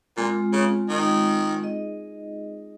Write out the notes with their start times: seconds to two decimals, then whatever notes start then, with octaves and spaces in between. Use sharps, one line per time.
0.17 A#2 G#3 C4 F4
0.53 C#3
0.89 D#3
1.62 D#4 G#4 D#5